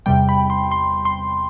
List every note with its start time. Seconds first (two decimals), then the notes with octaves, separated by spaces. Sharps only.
0.06 E2 C3 G3 G5
0.29 B5
0.50 C6
0.71 C6
1.05 C6